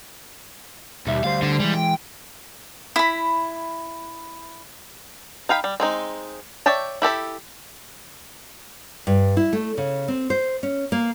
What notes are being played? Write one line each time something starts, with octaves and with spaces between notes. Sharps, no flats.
D#2 B2 G3 E5
D2 G3 C5 F5
D3
E3 G3 G#3
G5
E4 B5
D#4 F5 G5 B5
G3
G#3 C4 D#4
C#5 D5 E5 G5 A5
E4 G4 A4 E5
G2
E4
A3
C#3
C4
C5
C#4
A#3